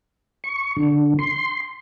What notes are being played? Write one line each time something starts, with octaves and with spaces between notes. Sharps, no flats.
C#6
D3
C6